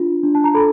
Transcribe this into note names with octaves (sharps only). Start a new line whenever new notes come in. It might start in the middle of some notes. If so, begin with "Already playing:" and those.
Already playing: D4 F4
D4
A5
A#5
A4 B5